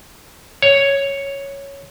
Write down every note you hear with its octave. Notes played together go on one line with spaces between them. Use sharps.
C#5